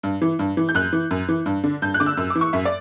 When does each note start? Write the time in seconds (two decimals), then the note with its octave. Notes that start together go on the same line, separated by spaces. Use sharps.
0.03 G2
0.22 E3
0.39 G2
0.57 E3
0.69 G6
0.75 F#2 F#6
0.93 E3
1.11 F#2
1.29 E3
1.46 G2
1.64 D3
1.82 G2 G6
1.94 F#6
2.00 D3 D6
2.06 E6
2.17 F#2 E6
2.30 D6
2.35 E3
2.41 C#6
2.53 F#2 E5
2.65 D5